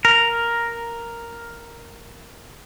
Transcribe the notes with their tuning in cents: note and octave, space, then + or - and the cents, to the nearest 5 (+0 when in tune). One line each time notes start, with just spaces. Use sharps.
A#4 +0